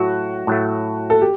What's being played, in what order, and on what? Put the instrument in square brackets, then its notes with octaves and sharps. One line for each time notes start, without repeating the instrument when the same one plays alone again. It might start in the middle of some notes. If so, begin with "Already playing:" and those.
Already playing: [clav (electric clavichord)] A2 F#3 A3 [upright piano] F#4
[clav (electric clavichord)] A2 F#3 A3
[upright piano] A4
G4